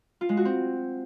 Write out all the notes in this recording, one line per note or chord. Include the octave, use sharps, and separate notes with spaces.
F4
G#3
F#4
C4